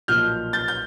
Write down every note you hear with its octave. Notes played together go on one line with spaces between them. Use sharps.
B1 A#2 F3 F6 G6
G6 A6
G6